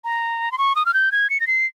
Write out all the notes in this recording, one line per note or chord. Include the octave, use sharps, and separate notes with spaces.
A#5
C6
C#6
D#6
F6
G6
G#6
C#7
A#6
C7